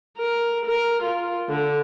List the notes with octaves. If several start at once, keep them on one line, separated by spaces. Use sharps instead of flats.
A#4
A#4
F4
D3